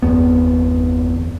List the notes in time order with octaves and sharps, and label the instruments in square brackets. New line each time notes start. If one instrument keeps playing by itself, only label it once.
[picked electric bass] G1 E2 B3